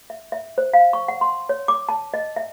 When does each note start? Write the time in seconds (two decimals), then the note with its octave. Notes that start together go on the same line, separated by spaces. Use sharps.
0.10 E5
0.32 E5
0.58 C5
0.74 F5
0.93 C#6
1.08 F#5
1.21 C6
1.49 C#5
1.68 D6
1.89 A5
2.14 D#5
2.36 E5